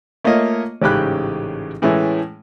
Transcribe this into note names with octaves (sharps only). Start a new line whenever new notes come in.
A3 A#3 F4 C#5 D#5
A1 G#2 C#3 G4 B5 F#6
A2 E3 G#3 A3 C#4